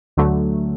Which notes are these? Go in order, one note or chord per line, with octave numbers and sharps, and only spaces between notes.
D2 D3 F#3 A3